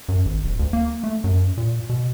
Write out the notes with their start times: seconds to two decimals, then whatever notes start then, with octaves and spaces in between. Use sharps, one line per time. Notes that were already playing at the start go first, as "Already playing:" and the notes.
0.09 F#2
0.25 G#1
0.44 D1
0.59 D2
0.73 A#3
1.04 A3
1.24 F#2
1.57 A#2
1.89 B2